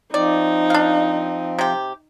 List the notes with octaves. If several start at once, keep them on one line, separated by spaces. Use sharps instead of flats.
F3 C4 D#4 D5
D4 F5
C3 G4